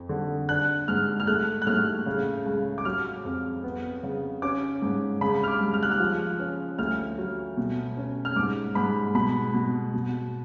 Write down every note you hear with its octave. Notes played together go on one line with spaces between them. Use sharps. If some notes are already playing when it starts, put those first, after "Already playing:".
Already playing: F2
D3
D4 F#6
G#2 F6
F6
A3 F#6
F#6
A2 F6
C#3
C#2
D6
F#3 F6
F2
B3
C#3
C#4 D6
G#2
C#3 B5
F6
D6
G#3
F6
F#6
F6
F3
C#4
D2 F6
F#3
B2
C#4
F6
G#2 D6
G#2 B5
B2 B5
B2
B2